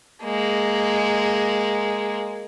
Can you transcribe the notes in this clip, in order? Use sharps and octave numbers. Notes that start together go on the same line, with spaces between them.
G#3 A#3